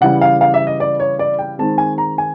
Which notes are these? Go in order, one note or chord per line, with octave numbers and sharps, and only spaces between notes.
C#3 E3 G3 F#5
F5
F5
E5
D#5
D5
C#5
D5
G5
D#3 G#3 C4 A5
G#5
A#5
G#5